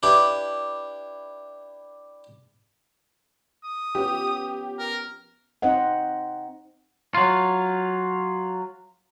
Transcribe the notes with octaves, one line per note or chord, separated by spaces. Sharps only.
D4 E4 G4 B4
D#6
F3 B3 C#4 G4
A#4
C4 D#4 C5 D#5 F#5
F#3 F4